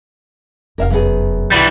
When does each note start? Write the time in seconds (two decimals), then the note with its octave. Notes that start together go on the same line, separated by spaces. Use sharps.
0.78 F1 A#4 E5 F5
0.90 F#2 B3 G#4
1.52 B1 E3 G3